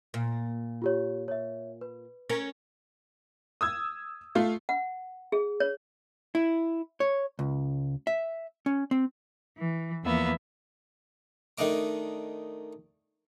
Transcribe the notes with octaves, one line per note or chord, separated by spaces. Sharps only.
A#2
F4 G4 C#5
C#5 E5
B4
C#4 A#4
D#6 E6 G#6
A3 F4
F#5
G#4
C#5
E4
C#5
C#2
E5
C#4
C4
E3
E2 F3 A#3 B3 E5
D#3 A3 D4 D#5 D6